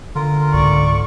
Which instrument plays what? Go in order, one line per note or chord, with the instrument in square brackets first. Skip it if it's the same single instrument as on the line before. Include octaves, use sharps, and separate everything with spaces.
[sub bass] D3 [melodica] F4 A#4
[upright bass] C#2 G#2 [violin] D5 C#6